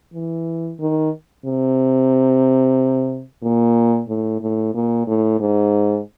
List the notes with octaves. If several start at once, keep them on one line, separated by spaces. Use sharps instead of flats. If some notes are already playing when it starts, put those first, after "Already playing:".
E3
D#3
C3
A#2
A2
A2
A#2
A2
G#2